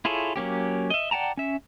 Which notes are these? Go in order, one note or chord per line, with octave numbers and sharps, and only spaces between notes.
E4 F4 G#4 A4 C#5
F#3 A#3 C#4 G4
D#5 E5
D5 F#5 G5 A5 A#5
C#4 E5